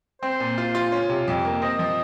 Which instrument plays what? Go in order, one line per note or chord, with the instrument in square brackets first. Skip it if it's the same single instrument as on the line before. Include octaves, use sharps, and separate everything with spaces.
[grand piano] C4 [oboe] C5
[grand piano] A#2
F4
F4
C#4
C3
F2
A#3
[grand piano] C4 [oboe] D#5
[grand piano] F3